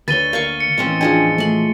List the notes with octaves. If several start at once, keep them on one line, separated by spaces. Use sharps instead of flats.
D2 D3 B4 C#5 A6 D#7 G7
A#3 F5 C#6
C#7
A2 E3 C4 C#4 D#5
F3 G#3 D4 D#5 G5 G#5
A3 B5 C6